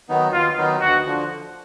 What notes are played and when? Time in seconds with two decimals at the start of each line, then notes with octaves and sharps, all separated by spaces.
0.09 D#3 F#3 B3 D#4
0.33 D#2 F4
0.57 D#3 F#3 B3 D#4
0.81 D2 F#4
1.05 D3 F3